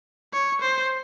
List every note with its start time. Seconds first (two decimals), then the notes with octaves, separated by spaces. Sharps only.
0.33 C#5
0.61 C5